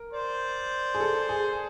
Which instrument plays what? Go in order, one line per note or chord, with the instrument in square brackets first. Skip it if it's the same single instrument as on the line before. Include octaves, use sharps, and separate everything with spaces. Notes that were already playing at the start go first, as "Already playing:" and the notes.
Already playing: [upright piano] A#4
[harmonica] C5 D5
[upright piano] G#4
A4
G#4